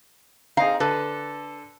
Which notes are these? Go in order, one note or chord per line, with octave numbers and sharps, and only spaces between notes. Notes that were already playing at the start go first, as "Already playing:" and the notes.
C4 D#4 G#4 F5 A#5
D3 A4 B4